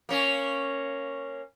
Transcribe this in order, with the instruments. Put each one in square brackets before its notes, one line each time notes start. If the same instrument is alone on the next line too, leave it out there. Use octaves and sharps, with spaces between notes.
[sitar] A#3 C#4